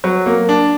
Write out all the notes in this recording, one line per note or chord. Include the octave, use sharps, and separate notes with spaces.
F#3
A#3
D4